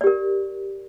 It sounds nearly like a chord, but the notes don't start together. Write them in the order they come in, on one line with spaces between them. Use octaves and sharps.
D5 G4 A#4